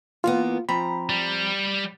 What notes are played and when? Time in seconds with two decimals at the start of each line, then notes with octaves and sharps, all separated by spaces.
0.24 E3 A#3 B3 F4
0.69 F3 C4 A#5 B5
1.09 G3